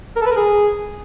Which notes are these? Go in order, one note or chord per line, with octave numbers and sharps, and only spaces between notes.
A#4
A4
B4
A#4
G#4